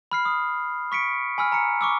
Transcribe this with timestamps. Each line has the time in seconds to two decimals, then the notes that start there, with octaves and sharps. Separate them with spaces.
0.11 B5 F6 C7
0.25 D#6
0.92 C#6 B6 C#7 D7
1.38 G#5 B5 E6 F6
1.52 A#5 C#7
1.81 C#6 D6 E6